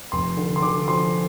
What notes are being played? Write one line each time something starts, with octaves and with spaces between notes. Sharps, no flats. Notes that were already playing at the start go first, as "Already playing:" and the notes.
F1 C6
D3
C6
D3 D6
F3 C6